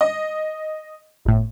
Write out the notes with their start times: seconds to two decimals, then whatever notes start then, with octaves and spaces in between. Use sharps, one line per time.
0.01 D#5
1.25 G1 A2